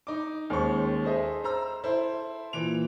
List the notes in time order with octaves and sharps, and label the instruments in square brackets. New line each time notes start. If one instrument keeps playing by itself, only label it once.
[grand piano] D#4 D6
D#2 G#3 C#4 C5 C#6
G#4 A4 C5 D#5 E5
C5 A#5 E6
E4 A4 C5
A#2 E3 D7 F7